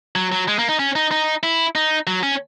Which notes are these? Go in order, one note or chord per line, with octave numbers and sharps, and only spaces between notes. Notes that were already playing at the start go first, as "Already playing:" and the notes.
F#3
F#3
G#3
A#3
D#4
C#4
D#4
D#4
E4
D#4
F#3
C#4